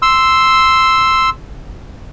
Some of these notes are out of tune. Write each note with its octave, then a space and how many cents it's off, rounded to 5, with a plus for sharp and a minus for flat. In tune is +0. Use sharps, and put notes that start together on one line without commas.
C6 +0 E6 +0